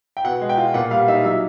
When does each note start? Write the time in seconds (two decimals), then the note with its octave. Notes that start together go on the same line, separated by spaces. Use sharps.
0.17 G5
0.24 B2 F#5
0.41 G#3
0.49 G5
0.57 F4
0.74 A#2 F#5
0.91 G3 F5
1.08 D#4 E5
1.25 F#3 E5